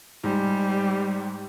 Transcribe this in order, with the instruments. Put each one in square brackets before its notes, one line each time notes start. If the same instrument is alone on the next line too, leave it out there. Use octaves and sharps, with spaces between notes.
[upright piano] G#2 [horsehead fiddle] G3